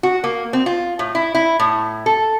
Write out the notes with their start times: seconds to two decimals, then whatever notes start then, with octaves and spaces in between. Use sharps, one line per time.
0.03 F#4
0.24 A#3
0.53 C4
0.66 F4
0.99 A2
1.15 E4
1.35 E4
1.60 A2
2.06 A4